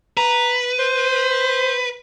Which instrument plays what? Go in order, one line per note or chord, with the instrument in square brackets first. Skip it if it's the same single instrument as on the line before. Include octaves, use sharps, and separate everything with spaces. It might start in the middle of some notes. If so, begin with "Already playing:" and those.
[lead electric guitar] B4 [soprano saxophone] A#5
[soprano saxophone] C5